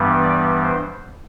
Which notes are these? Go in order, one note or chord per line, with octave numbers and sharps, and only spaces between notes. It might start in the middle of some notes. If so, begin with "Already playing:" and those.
Already playing: G2 E3 G3 B3
D5
C5